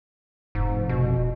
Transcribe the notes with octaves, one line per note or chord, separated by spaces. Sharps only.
F1 G#2
B2